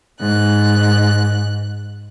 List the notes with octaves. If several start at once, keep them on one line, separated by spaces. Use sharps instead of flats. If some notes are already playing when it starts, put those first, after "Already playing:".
G#2 F#6